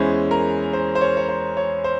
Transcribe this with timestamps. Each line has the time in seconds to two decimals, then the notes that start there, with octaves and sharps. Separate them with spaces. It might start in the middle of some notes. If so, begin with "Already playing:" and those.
Already playing: E2 E3 G#3 C#4 C5
0.31 A#4
0.73 C5
0.95 C5
1.01 C#5
1.17 C#5
1.29 C5
1.57 C#5
1.84 C5